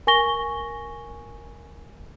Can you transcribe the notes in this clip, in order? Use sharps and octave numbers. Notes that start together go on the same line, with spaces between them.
A#4 G#5 C#6 A#6 G7